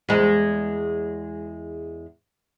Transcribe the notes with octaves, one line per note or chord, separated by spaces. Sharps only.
E2 G#3